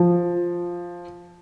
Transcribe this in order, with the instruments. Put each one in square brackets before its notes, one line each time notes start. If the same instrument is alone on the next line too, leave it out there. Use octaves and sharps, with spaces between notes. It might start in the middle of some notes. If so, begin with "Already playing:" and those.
Already playing: [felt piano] F3